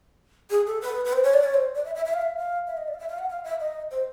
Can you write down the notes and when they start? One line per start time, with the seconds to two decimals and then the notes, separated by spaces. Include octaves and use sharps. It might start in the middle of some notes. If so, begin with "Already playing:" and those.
0.50 G#4
0.67 A4
0.81 B4
1.05 B4
1.13 C5
1.24 C#5
1.34 D5
1.44 C#5
1.54 C5
1.75 D5
1.85 E5
1.95 E5
2.05 E5
2.14 F5
2.22 E5
2.37 F5
2.67 E5
2.77 D#5
2.88 D5
2.94 F5
2.99 E5
3.09 F5
3.19 F#5
3.30 F5
3.44 E5
3.60 D#5
3.91 C5